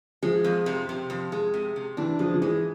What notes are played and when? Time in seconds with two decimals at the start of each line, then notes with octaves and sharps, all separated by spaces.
0.23 F3 G#3
0.44 F2
0.66 C3
0.89 C3
1.10 F2
1.32 G#3
1.54 C3
1.76 C3
1.97 E3 D4
2.19 F3 G#3
2.34 F3
2.41 E3 G#3